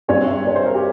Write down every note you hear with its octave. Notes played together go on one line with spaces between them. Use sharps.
G2 G3 C4 C#5
E5
C#5
C5
A#4
G4